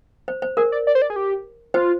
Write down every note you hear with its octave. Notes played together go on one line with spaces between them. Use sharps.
C5
C5
G#4 A#4
D5
D5
C5
D5
G#4
G4
F4 C5